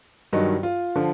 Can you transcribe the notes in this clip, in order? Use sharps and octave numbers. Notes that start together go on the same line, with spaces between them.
G2 D#3 F#3 D#4
F4
D3 F3